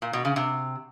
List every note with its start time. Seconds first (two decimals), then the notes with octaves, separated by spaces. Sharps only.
0.02 A#2
0.13 B2
0.25 C#3
0.36 C3